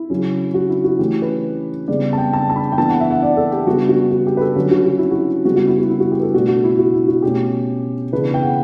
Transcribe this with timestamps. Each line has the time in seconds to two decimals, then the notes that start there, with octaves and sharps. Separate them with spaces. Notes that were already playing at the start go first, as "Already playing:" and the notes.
Already playing: E4
0.10 C#3 F#3 C#4
0.54 F#4
0.69 E4
0.84 F#4
0.99 E3 A3 C#4 G4
1.22 B4
1.88 C#3 G3 B3 D5
2.13 A5
2.18 G5
2.33 A5
2.50 A5
2.56 B5
2.72 G5
2.77 E3 B3 D4 A5
2.89 F#5
3.00 E5
3.11 F#5
3.23 D5
3.37 A4
3.51 G4
3.66 C#3 G3 B3 D4 F#4
3.89 F#4
4.11 F#4
4.27 G4
4.37 B4
4.41 A4
4.56 D3 F#3 C#4 F#4
4.71 F#4
4.86 F#4
4.98 E4
5.11 F#4
5.44 C#3 G3 B3 F#4
5.56 F#4
5.67 E4
5.78 F#4
5.89 E4
6.00 F#4
6.12 G4
6.19 B4
6.22 A4
6.34 B2 A3 D4 F#4
6.48 F#4
6.64 E4
6.79 F#4
6.94 E4
7.08 F#4
7.22 B2 A3 C#4 G4
8.12 C#3 E3 B3 D4 B4
8.34 G5
8.42 F#5